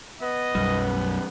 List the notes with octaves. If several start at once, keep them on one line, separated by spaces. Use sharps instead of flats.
B3 D#5
B1 F#2 G3